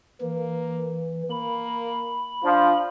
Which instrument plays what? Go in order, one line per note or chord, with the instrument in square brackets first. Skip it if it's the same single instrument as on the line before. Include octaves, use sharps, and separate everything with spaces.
[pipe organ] E3 [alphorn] A#3
[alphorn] A#3 [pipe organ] B5
[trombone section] F3 [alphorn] D4